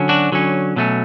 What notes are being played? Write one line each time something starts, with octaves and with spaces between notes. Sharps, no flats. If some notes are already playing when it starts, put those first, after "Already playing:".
Already playing: D3 F#3 C#4
D4 F#4
D3 F#3 C#4
B2 F#3 A3 C#4